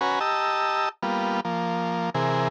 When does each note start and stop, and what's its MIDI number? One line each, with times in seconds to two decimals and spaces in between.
0.01 0.19 61
0.01 0.19 66
0.01 0.19 71
0.01 0.19 80
0.01 0.19 82
0.20 0.89 67
0.20 0.89 75
0.20 0.89 81
0.20 0.89 82
0.20 0.89 88
1.03 1.40 55
1.03 1.40 58
1.03 1.40 59
1.03 1.40 65
1.45 2.10 53
1.45 2.10 58
2.15 2.48 48
2.15 2.48 52
2.15 2.48 68
2.15 2.48 70